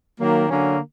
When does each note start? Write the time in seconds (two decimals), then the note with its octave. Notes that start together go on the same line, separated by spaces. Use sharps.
0.20 D#3 F#3 A#3
0.49 D3 F#3 A#3 C#4